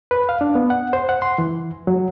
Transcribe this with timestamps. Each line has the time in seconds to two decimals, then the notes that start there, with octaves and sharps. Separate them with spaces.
0.11 B4
0.29 F5
0.41 D4
0.55 B3
0.70 F#5
0.93 C5
1.09 F#5
1.22 C6
1.38 E3
1.87 F#3